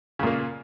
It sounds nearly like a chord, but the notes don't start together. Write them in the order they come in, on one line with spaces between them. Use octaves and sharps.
C#3 A#2 A#3